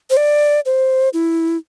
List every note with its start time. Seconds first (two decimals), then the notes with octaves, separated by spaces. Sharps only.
0.10 C5
0.17 D5
0.66 C5
1.13 E4